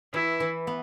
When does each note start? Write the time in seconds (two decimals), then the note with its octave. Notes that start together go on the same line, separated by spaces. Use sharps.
0.14 E3 E4
0.40 E3
0.67 B3